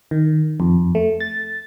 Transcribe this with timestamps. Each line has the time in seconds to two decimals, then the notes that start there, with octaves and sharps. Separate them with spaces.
0.11 D#3
0.60 F2
0.95 A3
1.20 A6